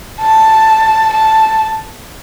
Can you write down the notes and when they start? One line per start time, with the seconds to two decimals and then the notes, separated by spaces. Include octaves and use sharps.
0.20 A5
1.13 A5